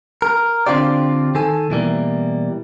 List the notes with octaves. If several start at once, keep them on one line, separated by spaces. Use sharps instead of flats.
A#4
D3 C4 D4 F4 G4 D5
D#3 A4 G#5
B2 E3 G3 A#3